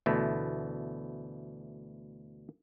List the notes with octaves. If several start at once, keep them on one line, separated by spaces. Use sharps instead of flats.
D2 B2 E3 A3